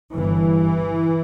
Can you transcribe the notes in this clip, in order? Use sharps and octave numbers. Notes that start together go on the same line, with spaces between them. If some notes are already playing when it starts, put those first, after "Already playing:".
G1 G2 E3